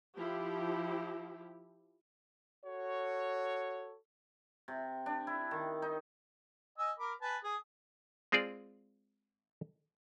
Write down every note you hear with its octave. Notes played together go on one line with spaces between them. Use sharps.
F3 E4 G4
F#4 A4 C#5
C3
D4
E4
D#3
D#4
D#5 G#5 E6
A#4 B5 D6
B4 G#5 A5
G#4 D#6
G#3 C4 F4 G#4 D5